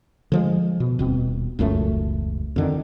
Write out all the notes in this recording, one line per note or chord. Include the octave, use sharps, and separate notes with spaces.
D3 F3 G#3
B2
D#1 B2 C4
E1 C#2 F#2 A3
F2 D3 D#3